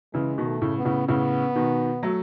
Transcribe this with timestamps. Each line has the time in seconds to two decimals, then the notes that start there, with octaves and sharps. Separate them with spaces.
0.14 C#3 E3 G#3
0.38 B2 D#3
0.45 A3
0.62 A2 C#3
0.78 B3
0.85 A2 C#3
1.08 A2 C#3 B3
1.55 B2 D#3
2.03 F#3 A3